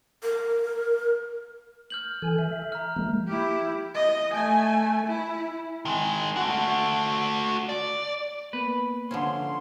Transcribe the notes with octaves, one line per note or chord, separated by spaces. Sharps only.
A#4
F6 G6 F#7
E3 A4 G#5
E5
A#5 F6
F3 G#3 A#3
E4 G4
D#5
A3 G#5
E4
D#3 G#3
A3 F#4
D5
A#3 B3 B4 B5
D3 F3 C#4 C6